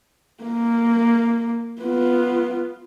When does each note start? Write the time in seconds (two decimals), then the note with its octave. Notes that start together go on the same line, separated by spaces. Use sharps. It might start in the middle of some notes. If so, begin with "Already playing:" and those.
0.43 A#3
1.82 B3 F4